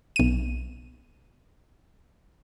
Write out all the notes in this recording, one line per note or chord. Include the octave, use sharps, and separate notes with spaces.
B1 D#7